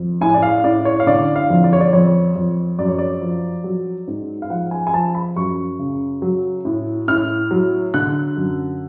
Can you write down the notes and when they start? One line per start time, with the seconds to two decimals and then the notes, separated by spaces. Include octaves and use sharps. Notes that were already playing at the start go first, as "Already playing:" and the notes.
Already playing: F2
0.21 A2 G#5
0.34 D5
0.42 F5
0.64 A2 D5
0.85 C#5
1.00 F5
1.07 D3 D5
1.36 F5
1.50 F2
1.64 D5
1.73 C#5
1.81 D5
1.93 F2 C#5
2.36 F2
2.79 F#2 D5
2.88 C#5
2.98 D5
3.22 F3
3.64 F#3
4.08 G#2
4.42 F5
4.50 F3 F#5
4.71 G#5
4.87 G#5
4.93 F3 A5
5.15 B5
5.36 F#2 C#6
5.79 C#3
6.22 F#3
6.65 A2
7.08 A2 F6
7.51 F#3
7.94 D3 F#6
8.37 F#2